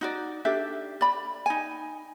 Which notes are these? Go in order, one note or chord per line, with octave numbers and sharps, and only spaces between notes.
D#4 F#4 D5
D4 G4 A4 E5
D5 B5
D#4 G#5